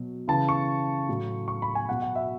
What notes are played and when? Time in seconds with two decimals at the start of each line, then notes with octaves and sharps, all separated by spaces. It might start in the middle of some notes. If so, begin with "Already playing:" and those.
Already playing: B2 F#3
0.28 C#3 E3 A5
0.49 C#6
1.09 A2 F#3
1.48 C#6
1.62 B5
1.75 G#5
1.89 B2 F#3 F#5
2.02 F#5
2.16 E5